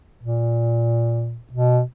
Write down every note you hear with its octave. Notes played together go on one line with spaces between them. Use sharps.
A#2
B2